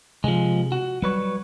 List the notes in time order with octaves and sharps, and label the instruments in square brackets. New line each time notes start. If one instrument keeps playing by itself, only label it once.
[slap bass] C3 [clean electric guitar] F3 G#3
[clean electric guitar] F#4
[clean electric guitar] F#3 B4 C#5 [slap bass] G3